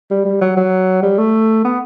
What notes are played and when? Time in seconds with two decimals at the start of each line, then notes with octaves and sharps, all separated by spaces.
0.11 G3
0.25 G3
0.41 F#3
0.57 F#3
1.02 G3
1.18 A3
1.64 B3